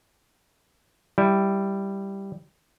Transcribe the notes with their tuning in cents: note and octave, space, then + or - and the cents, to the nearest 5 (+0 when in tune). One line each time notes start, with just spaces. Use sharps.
G3 +0 E4 -5